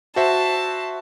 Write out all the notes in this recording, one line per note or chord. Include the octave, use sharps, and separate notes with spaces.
F#4 C5 E5 A5